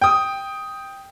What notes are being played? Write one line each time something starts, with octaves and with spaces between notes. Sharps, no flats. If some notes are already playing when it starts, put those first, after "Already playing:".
G5 D#6